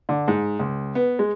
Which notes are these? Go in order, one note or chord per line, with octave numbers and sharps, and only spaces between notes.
D3
G#2
C#2
B3
G#3